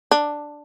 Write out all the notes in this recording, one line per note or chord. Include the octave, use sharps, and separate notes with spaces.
D4